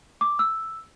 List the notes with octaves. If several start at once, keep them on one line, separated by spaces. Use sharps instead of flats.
D6
E6